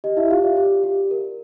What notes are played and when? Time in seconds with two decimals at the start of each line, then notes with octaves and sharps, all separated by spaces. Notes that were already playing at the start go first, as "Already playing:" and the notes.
0.04 G4 D#5
0.17 E4 E5
0.31 F4 G4 F5
0.44 D5
0.57 G4
0.84 G4
1.11 A#4